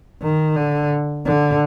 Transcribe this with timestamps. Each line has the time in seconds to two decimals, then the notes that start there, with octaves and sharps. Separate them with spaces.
0.22 D#3
0.56 D3
1.26 D3